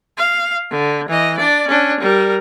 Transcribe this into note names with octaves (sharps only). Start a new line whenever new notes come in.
F5
D3
E3 D#5
D4 D5
C#4 D4
G3 A#4